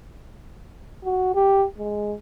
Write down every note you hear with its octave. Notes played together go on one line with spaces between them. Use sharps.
F#4
G4
G#3